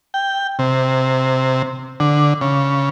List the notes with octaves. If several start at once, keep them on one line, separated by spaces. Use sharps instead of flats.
G5
C3
D3
C#3